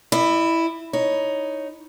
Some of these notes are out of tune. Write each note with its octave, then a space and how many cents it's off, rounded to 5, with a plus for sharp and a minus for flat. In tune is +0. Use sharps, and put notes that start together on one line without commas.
E4 +0 D#5 -45
D#4 +0 C#5 +0